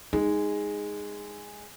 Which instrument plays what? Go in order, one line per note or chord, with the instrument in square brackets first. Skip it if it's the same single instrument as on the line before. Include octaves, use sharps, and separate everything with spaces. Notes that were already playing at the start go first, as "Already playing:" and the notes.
[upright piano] G#3 [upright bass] D#4